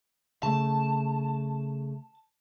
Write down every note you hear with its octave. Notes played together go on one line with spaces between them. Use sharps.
C#3 A3 A5